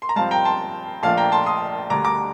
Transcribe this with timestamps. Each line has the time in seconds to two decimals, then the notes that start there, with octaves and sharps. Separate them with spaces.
0.02 C6
0.09 A#5
0.16 G2 F3 C4 F5 A5
0.31 G5 A#5
0.45 A5 C6
1.03 A#1 A#2 F3 A3 D4 F5 A5
1.17 G5 A#5
1.32 A5 C6
1.46 C6 D#6
1.90 D2 D3 G3 D4 A#5 D6
2.04 A#5 D6